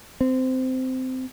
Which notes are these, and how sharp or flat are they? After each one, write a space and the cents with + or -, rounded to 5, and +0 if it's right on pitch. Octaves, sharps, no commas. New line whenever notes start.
C4 -15